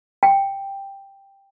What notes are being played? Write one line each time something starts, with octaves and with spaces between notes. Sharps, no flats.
G5